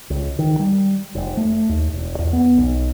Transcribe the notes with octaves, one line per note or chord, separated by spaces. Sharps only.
C#2
D#3
G3
F1
A3
D#2
E1
E2
B3
B1